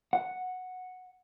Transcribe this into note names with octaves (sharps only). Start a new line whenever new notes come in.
F#5